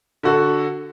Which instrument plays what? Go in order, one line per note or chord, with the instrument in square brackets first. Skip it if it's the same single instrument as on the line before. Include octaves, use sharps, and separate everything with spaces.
[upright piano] D3 F#4 A4